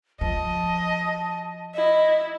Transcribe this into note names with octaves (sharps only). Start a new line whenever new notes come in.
F3 D#5 A5
E4 D#5